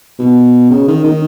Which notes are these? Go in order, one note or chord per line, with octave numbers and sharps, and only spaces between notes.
B2
C#3
D#3
D#3